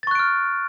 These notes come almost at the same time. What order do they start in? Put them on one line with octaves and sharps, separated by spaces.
A6 C#6 F#6 D7 F6